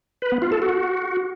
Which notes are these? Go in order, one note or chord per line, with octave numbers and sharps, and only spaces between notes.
B4
B3
F4
A4
F#4